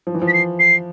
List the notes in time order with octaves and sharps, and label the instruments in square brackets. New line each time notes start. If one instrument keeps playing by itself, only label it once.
[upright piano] F3
E3
F3
[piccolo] B6
C7
C7